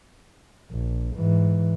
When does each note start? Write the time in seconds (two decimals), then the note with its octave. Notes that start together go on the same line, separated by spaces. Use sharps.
0.71 A#1
1.17 G#2 E3